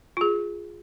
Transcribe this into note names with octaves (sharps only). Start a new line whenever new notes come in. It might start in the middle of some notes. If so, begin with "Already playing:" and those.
F4 G#4